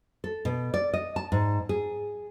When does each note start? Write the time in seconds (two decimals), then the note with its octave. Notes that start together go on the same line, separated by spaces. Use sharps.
0.24 A4
0.45 B2
0.74 D5
0.94 D#5
1.16 A5
1.32 G#2
1.69 G#4